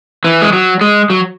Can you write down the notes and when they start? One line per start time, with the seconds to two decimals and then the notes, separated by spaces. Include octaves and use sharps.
0.24 E3
0.42 G#3
0.53 F#3
0.81 G#3
1.10 F#3